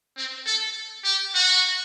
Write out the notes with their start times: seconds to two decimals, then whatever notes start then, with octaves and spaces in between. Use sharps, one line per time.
0.17 C4
0.46 A4
1.05 G4
1.35 F#4